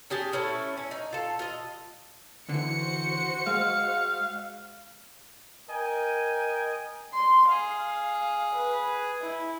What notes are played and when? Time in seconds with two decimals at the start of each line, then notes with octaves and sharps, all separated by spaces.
0.10 C#4 G4 G#4 A5
0.32 A3 C#4 E4 A4
0.77 C#4
0.91 D#4
1.13 F4 A4
1.39 F4 D#5
2.49 D3 E3 F#4 C5 C#7
3.47 G#3 F5
5.70 A#4 D#5 G5 G#5
7.14 C6
7.49 G#4 F5
8.55 B4
9.22 E4